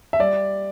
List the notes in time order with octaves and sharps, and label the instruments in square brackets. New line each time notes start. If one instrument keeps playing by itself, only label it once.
[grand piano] E5
G3 D5